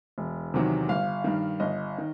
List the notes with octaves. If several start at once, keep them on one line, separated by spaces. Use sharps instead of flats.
E1
E2 C3 D#3 F#3
G1 F5
G2 D#3
G1 D#5
D#3